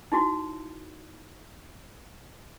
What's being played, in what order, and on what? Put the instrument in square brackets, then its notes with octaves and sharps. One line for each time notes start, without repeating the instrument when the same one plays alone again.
[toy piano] D#4 E4 F#4